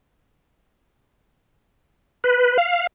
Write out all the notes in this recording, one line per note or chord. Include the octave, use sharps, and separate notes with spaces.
B4
F5